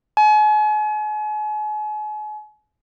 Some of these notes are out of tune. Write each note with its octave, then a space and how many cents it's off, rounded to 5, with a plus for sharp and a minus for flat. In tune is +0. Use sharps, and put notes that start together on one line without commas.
G#5 +40